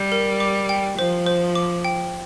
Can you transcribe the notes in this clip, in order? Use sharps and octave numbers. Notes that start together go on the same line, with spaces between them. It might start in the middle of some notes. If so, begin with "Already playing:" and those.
Already playing: G3 G6
A#4
D6
G5
F3 C5
C5
D6
G5